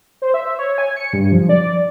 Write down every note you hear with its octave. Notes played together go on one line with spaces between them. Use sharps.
C5
E5
C#5
G#5
C#7
G2
F3
D5